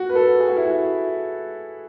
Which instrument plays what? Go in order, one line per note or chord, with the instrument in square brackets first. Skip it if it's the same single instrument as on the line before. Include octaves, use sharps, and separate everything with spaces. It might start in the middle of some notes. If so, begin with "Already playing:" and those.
Already playing: [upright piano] F#4
B4
A4
G#4
F#4
E4
F#4